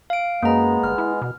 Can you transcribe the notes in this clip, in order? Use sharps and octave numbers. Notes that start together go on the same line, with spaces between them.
F5 D7
F#2 G#3 A#3 B3 A#5
G1 F6
E4
B2